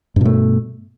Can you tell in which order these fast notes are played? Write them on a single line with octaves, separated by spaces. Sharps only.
G2 B2 A3